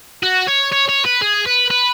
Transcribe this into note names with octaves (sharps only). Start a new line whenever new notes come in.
F#4
C#5
C#5
C#5
B4
G#4
B4
B4